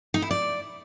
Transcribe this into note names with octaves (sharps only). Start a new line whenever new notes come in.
D#4
E4
D5